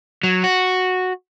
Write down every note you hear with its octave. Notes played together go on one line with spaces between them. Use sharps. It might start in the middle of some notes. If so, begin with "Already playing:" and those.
F#3
F#4